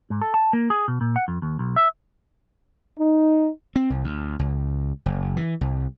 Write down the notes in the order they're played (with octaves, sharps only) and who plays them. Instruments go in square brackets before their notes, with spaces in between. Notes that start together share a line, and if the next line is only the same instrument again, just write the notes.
[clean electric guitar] G#2
A4
A5
A#3
G#4
B2
A#2
F#5
F2
D#2
B1
E5
[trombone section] D#4
[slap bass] C4
C2
D2
C#2
F#1
E3
C2